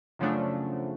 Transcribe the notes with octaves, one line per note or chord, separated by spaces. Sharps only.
F#2 C#3 F3 F#3 A3 D4